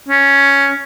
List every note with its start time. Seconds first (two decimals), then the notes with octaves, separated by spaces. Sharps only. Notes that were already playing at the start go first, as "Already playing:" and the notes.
0.09 C#4